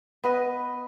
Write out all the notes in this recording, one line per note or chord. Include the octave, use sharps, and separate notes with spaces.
B3 B4 D#5